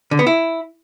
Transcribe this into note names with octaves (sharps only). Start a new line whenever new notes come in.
D3
B3
E4